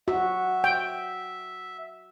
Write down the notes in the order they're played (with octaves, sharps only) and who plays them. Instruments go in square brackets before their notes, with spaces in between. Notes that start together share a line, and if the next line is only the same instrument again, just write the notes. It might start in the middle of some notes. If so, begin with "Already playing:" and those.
[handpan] F#4 [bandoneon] E5
[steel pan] G5